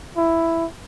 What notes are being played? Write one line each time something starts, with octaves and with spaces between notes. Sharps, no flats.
E4